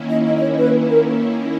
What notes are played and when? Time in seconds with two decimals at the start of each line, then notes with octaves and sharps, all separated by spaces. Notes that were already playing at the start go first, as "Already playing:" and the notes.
Already playing: D#3 A#3 C#4 E4
0.10 D#5
0.25 D#5
0.36 D#5
0.41 C#5
0.57 B4
0.88 A#4